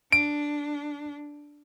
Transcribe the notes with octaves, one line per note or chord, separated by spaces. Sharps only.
D4 D7